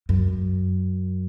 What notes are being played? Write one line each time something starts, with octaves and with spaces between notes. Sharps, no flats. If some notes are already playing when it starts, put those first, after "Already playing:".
F#2